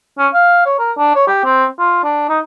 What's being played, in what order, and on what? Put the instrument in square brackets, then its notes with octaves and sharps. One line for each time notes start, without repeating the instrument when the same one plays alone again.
[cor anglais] C#4
F5
C#5
A#4
D4
C#5
G4
C4
F4
D4
D#4